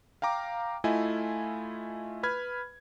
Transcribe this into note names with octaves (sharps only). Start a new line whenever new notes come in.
F5 G5 A#5 D6
A3 E4 F4 D#5 G#5
B4 B5 F6 G#6